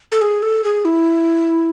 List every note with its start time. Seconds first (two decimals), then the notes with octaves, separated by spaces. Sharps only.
0.12 A4
0.21 G#4
0.42 A4
0.64 G#4
0.85 E4